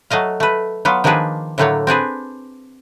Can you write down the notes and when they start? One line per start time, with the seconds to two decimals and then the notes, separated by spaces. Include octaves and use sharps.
0.10 F#3 A3 D#5 F5
0.40 A3 B4
0.85 F#3 B3 F4
1.04 D#3 F3 A#3 D4 G#4 B4
1.58 A2 D3 F#3 A3 A#3 C#5
1.87 C4 D4 G#4 B4